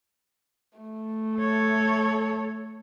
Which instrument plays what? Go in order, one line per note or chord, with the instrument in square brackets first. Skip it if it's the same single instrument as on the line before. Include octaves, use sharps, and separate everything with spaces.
[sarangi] A3
[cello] A4 C#5